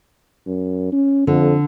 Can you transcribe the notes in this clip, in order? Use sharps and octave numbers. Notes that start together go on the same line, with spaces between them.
F#2
C#4
F2 D3